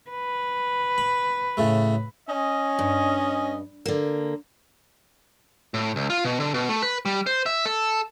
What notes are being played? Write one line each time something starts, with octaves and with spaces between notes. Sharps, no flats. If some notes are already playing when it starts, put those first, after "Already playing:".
B4
B5
A2 C#3 A3
C#4 D#5
G2
D3 A#3
A2
C#2
F4
B2
D3
B2
A3
B4
G3
C5
E5
A4